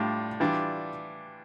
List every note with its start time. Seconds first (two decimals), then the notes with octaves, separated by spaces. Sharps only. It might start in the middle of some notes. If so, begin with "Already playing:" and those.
Already playing: A2 G3 D4 F4
0.40 E3 G3 D4 F4